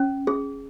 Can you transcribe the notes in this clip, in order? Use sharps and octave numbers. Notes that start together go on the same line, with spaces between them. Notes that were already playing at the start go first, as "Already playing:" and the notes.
Already playing: C#4
G#4